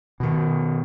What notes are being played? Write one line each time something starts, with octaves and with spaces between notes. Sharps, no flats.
B2 D#3